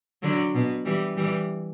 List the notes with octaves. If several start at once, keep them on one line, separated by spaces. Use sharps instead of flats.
D3 F#3
B2
E3 G3
E3 G3